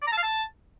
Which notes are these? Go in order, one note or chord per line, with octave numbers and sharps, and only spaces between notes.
D5
A#5
A5
F5
A5